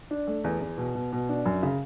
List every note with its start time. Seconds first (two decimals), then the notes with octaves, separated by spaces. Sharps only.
0.11 D4
0.27 A3
0.44 E2
0.61 E2
0.77 B2
0.95 B2
1.12 B2
1.29 D4
1.45 F#2
1.63 C#3